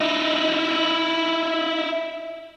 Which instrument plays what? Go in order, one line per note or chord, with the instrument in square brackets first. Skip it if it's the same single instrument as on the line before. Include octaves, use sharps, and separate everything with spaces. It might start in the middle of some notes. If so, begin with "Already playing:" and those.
[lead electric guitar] D#4 E4